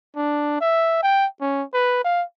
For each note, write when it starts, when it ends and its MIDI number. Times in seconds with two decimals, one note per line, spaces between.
0.16 0.58 62
0.61 0.99 76
1.02 1.26 79
1.41 1.63 61
1.74 1.99 71
2.04 2.23 77